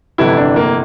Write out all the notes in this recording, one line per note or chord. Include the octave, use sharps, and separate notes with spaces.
G1 F2 C3 E3 A3 E4
D4
A#3